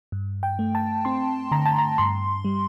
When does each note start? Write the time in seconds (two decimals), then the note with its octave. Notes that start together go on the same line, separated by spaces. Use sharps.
0.12 G2
0.43 G5
0.59 A3
0.75 A5
1.05 C4 C6
1.51 D3 A#5
1.66 A5
1.79 A#5
1.98 G2 C6
2.45 G3